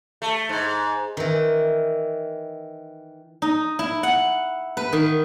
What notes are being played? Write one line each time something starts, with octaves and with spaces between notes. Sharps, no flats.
A3
G#2
D#3 E3
D#4
E4
F#5
B4
D#3